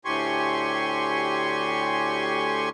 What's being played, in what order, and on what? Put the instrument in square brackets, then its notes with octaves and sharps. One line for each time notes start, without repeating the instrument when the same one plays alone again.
[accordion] D2 A2 G4 G#5 C6 C#6